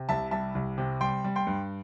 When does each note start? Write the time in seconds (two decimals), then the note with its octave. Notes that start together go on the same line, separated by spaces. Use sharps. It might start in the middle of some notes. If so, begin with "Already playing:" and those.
Already playing: C3
0.09 C2 E5 A5
0.31 G3 E5 A5
0.55 C2
0.78 C3
1.01 G3 G5 C6
1.24 G3
1.36 G5 C6
1.47 G2